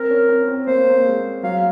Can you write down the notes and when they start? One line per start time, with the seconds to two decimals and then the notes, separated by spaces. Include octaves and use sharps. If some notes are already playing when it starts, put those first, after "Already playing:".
Already playing: C4 A#4
0.11 C#4
0.29 C4
0.48 C4
0.67 A#3 C5
0.78 C4
0.90 A#3
1.06 G#3
1.43 F#3 F5